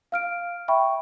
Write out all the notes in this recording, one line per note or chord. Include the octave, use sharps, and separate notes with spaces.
F5 F6 D7
E5 G5 B5 C#6